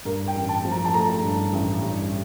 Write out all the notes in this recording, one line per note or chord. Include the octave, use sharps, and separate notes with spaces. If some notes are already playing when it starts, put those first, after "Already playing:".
G2 A#4
G5
A1
A5
F3
A#5
A5
A3 A#5
G2
A1
G2